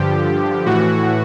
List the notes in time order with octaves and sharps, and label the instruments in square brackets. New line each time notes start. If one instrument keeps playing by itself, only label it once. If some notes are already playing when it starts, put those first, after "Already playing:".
Already playing: [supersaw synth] G2 D3 F3 G4
A2 E3 F#4